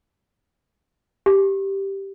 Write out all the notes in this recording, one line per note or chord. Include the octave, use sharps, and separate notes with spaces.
G4